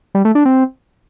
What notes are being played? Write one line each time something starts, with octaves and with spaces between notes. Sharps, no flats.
G3
A3
D4
C4